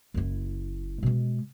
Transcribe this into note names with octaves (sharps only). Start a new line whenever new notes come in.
F#1 E4
B2 G#3